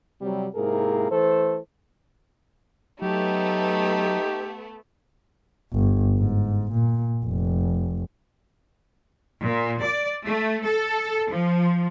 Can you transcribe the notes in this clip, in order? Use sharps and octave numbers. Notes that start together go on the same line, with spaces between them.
C3 F#3 G3
G#2 C3 A#3 E4 G#4 A#4
E3 A3 A4 C5
F#3 A3 B3 D#4 G4
G1
G#2
A#2
F1
A#2
D5
A3
A4
F3